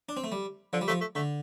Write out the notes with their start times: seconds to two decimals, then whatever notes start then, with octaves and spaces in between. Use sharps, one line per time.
0.09 D4
0.17 C4
0.24 A3
0.32 G3
0.73 D3 F3
0.81 G3
0.88 F3 A3
1.01 A3
1.15 D3 A3